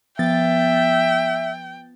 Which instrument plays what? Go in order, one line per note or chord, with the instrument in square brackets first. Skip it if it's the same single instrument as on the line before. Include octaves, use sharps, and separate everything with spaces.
[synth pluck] F3 B3 A6 [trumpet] E5 [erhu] G5